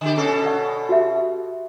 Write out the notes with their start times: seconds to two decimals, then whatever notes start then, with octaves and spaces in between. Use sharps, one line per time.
0.01 D3 G4
0.16 B2 C#4 A4
0.45 D5 F#5 C#6
0.89 F#4 G4 E5